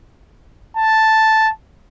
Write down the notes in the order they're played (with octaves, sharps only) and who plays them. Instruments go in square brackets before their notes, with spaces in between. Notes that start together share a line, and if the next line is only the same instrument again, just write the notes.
[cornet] A5